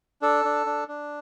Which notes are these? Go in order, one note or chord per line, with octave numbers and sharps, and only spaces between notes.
D4 A4
D4
D4
D4